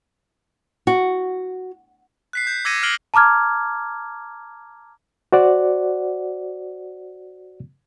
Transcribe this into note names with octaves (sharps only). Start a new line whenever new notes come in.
F#4
F#6 B6 C7
G6
D6 E6 G#6 A#6 C#7 D#7
F6 A#6 C7 D7 F#7 G7
A5 A#5 D6 F6 G#6
F#4 C5 D5 F#5